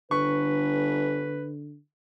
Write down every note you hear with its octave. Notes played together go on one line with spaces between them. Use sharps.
G1 D3 B4 C#6